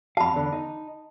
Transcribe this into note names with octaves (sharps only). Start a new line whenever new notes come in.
F2 F5 A5 B5
E2 D3
D#4